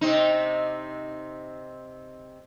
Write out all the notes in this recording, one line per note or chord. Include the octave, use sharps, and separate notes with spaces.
C3 C4 D#4